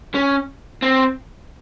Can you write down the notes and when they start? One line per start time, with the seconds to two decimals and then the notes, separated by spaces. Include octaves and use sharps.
0.15 C#4
0.82 C4